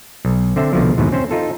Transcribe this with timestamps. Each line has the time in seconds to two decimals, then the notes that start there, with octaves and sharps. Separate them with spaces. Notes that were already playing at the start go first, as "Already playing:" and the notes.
0.25 B1
0.56 D3 C4 E5 A5
0.73 C2 B2 D3 F3
0.98 D#2 G#2 B2 E3
1.12 C4 C#4 C5
1.31 D#4 F4 A4